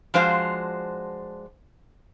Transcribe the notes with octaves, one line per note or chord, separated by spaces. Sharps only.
F3 G#3 D4 F#4 C5 F5